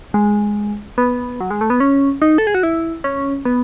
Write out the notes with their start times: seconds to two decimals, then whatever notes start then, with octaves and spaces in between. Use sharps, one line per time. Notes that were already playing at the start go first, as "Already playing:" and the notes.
0.14 G#3
0.98 B3
1.41 F#3
1.50 G#3
1.61 A3
1.70 B3
1.80 C#4
2.22 D#4
2.38 A4
2.47 G#4
2.55 F#4
2.63 E4
3.04 C#4
3.45 B3